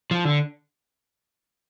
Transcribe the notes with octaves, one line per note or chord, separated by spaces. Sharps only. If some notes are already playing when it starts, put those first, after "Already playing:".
F3
D3